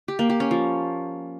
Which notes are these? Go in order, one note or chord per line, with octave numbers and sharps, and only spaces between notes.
G4
A#3
G4
C#4
F3